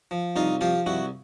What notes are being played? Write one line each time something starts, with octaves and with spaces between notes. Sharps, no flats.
F3
C2 D#4 F4
F3 F4 G4
C2 E4 F#4